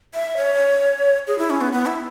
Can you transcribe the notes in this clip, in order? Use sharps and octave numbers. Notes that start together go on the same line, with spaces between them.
E5
C#5
G#4
E4
C#4
B3
B3
E4